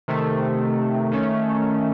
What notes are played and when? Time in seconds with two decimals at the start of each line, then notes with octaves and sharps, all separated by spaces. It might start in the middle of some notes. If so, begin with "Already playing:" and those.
0.08 C3 D#3 A3
1.12 D#3 A3 C#4